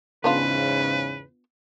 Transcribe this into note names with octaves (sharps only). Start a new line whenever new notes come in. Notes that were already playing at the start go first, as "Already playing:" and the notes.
E2 G#2 C#3 B3 D4 F4 B4